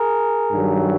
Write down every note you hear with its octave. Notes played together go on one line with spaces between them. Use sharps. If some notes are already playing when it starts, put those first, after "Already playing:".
Already playing: G#4 A#4
G2 D#3 F#3